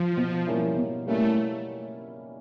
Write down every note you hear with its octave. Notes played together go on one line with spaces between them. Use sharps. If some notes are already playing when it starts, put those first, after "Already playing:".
Already playing: F3
B2
G3 A#3 C#4 E4
B2
G3 A3 A#3 C#4 E4